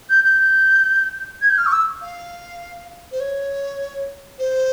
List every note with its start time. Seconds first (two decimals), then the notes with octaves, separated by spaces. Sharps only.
0.09 G6
0.24 G6
1.41 G#6
1.49 G6
1.57 F6
1.66 C#6
1.72 E6
2.01 F5
3.11 C5
3.20 C#5
4.38 C5